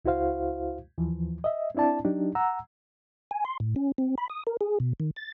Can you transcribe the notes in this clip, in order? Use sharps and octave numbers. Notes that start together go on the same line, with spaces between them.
C#2 E4 F#4 C5 F5
D#2 E3 F3
D#5 E5
C4 D4 E4 D5 A5
F#3 D4 D#4 G4
F#5 A#5 E6
G#5
C6
A2
C#4
C4
B5
D#6
A#4
G#4
B2
D#3
A6